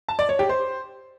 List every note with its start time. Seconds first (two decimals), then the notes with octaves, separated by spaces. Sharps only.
0.09 A5
0.19 D5
0.29 C#5
0.39 G4
0.49 C5